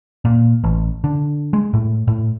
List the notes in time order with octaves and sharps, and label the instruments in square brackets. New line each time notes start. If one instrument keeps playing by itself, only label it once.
[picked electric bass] A#2
A1
D3
G#3
A2
A2